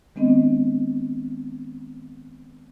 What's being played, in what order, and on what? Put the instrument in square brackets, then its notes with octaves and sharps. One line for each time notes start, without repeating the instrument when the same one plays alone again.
[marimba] D#3 G#3 B3 C4 D4 D#5